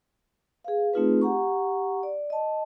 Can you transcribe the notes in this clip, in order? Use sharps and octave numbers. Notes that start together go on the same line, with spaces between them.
G#4 B4 F5
A3 C4 D#4 F4 G#4 B4
G4 F#5 A#5 C#6
D5
D#5 A5